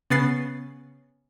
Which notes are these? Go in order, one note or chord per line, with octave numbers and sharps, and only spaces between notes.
C#3 B3 A6 C7